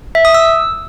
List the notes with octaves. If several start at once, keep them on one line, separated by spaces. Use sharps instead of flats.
E5
D#6
E6